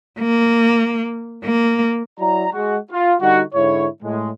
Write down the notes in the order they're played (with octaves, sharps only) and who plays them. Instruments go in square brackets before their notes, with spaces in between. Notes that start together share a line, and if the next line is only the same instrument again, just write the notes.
[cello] A#3
A#3
[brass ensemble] F#3 E4 D5 A#5
G#3 F#4
F4
D3 G3 D#4 F#4
G#2 D3 E4 C#5
A2 G#3